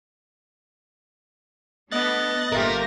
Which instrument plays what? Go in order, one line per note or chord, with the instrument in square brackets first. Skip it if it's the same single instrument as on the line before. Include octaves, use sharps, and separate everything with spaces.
[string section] A3 B3 D4 [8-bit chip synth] D#5 F#6 A6
[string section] G1 A#3 A#6 [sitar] A3 F4 G4 [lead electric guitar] A#4